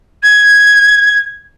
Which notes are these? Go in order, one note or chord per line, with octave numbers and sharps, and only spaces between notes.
G#6